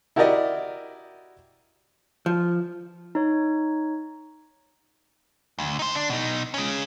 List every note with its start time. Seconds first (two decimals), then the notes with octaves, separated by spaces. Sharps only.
0.16 E4 F#4 G4 A#4 D5 D#5
2.26 F3
3.15 D#4 C#5
5.59 D2
5.79 D#4 C5
5.95 D4
6.10 B2 D#4
6.54 G#3 C#4